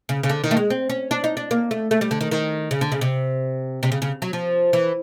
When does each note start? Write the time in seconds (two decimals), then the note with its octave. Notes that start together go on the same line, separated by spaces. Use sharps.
0.09 C#3
0.23 C#3
0.29 D3
0.44 D#3
0.51 A3
0.57 G#3
0.70 C4
0.90 C#4
1.11 D4
1.24 D#4
1.37 D4
1.51 A#3
1.71 A3
1.91 A3
2.01 G3
2.11 D3
2.21 D#3
2.31 D#3
2.71 C#3
2.81 D3
2.92 C#3
3.01 C3
3.83 C3
3.92 C#3
4.02 C#3
4.22 F#3
4.33 F3
4.73 E3